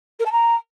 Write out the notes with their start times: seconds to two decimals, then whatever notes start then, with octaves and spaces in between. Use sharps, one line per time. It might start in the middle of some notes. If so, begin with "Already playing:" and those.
0.19 A#4
0.25 A5
0.31 A#5